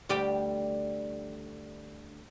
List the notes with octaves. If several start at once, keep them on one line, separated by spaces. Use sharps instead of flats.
D2 G3 G4